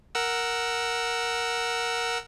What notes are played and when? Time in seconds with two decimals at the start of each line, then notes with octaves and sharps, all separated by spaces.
0.15 A#4 F#5 E6